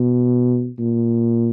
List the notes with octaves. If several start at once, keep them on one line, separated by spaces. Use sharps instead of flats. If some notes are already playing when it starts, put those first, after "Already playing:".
Already playing: B2
A#2